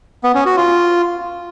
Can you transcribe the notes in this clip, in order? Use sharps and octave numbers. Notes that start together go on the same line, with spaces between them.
B3
C#4
F#4
F4